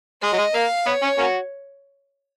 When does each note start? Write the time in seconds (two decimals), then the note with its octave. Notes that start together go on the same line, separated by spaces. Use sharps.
0.23 G#3 D#5
0.33 F#3
0.38 G#3
0.54 A#3 F5
0.86 B3 C#5
1.03 C#4
1.18 A#3 C#4 F#4